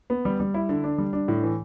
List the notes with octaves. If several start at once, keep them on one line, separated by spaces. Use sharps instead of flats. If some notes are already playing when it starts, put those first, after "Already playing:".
B3
G3
G3
E4
D3
D4
G3
D4
A2
E3